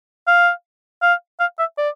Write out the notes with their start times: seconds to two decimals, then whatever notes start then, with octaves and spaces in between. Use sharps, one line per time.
0.27 F5
1.02 F5
1.40 F5
1.59 E5
1.78 D5